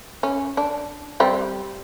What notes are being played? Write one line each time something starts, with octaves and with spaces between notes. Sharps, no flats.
C#4
D4
G3 C4